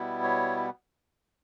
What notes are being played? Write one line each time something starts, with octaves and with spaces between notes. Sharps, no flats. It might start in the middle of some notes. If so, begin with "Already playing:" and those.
Already playing: B2 G3 B3 E4
C#5